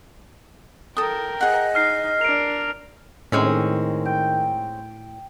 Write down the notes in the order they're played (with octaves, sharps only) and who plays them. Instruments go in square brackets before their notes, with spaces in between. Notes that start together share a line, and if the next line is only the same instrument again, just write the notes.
[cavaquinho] A4 D#6 [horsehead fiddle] A#4 G5
[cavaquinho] G#4 F#5 [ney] D#5
[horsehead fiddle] D#4 [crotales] F6 C7
[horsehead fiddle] D4 A#4 [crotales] D7 F7
[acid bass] A2 [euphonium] D#3 [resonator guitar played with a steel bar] G#3 C4 C#4
[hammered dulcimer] G5